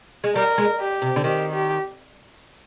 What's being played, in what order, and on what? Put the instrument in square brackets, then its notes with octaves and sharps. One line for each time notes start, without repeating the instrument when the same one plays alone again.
[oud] G#3
[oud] G3 [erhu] A#4
[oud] G#3
[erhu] G4
[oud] C3
D3
[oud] D#3 [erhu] G4
[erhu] G4